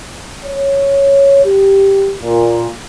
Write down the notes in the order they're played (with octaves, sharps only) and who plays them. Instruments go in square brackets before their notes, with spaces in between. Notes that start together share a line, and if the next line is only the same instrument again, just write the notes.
[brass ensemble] C#5
G4
A#2